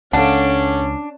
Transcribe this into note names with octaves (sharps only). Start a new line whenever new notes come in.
C#2 C#4 D4 A4 F5 F#5